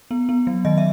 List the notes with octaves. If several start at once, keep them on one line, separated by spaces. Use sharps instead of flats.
B3
B3
F#3
D#3 D#5
E5